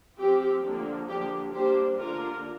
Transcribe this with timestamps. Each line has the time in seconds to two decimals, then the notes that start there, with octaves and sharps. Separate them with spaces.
0.17 F3 C4 G4
0.62 D3 F3 A#3 D4
1.07 D3 F3 A#3 D4 G4
1.53 G3 A#3 D4 G4 C5
1.98 D3 A#3 D4 F4 A#4